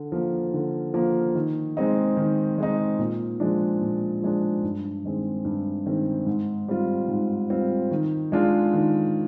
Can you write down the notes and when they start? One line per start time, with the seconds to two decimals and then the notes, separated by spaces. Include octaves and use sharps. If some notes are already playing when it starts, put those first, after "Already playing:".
Already playing: D3
0.12 F3 A#3
0.54 D3
0.94 F3 A#3
1.35 D#3
1.77 G#3 C4 D#4
2.17 D#3
2.58 G#3 C4 D#4
2.99 A#2
3.40 F3 G#3 D4
3.81 A#2
4.22 F3 G#3 D4
4.63 G2
5.04 D#3 G#3 C4
5.45 G2
5.86 D#3 G#3 C4
6.26 G#2
6.68 G3 C4 F4
7.09 G#2
7.50 G3 C4 F4
7.91 D#3
8.32 G#3 D4 F4
8.73 D#3